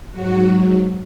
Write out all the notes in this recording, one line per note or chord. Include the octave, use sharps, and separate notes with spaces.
G#2 F#3 F#4